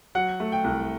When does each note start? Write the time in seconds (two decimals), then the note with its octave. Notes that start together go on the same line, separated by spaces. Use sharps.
0.15 F#3 F#5
0.40 A3
0.52 G5
0.64 C2